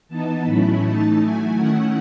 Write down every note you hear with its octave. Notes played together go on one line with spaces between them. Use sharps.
E3 B3 D#4 A5
A2 F#3 A3 C#4 E4 B5
E3 A3 D#4 A5
F#3 A3 E4 G#5
D#3 A3 C#4 E4 F#5